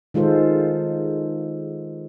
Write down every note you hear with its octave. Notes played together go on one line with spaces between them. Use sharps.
D#3 G#3 F4 A4 C5